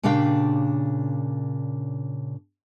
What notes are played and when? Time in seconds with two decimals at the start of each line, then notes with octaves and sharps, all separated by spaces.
0.03 A#2 C#3 D4 G4 F5 G5